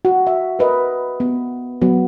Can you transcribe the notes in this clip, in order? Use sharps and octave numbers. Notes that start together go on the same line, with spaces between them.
F#4
E5
A#4 B4 D#5
B3
F#3 B3